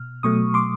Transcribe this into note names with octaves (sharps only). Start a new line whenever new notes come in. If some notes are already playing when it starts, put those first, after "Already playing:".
Already playing: B2 F6
B2 F#3 A3 C#6 D#6
C6 D6